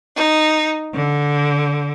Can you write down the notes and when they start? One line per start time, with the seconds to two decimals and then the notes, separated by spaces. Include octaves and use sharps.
0.17 D#4
0.95 D3